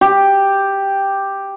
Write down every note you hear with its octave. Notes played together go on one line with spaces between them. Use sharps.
G4